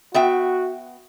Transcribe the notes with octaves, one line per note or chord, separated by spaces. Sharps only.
B3 F#4 E5 G5